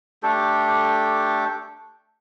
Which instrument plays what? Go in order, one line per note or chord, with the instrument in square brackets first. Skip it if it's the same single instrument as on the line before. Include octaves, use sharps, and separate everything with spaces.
[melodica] A3 D4 G4 A4